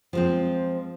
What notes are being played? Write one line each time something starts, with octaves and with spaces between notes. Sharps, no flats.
F3 G#3 C4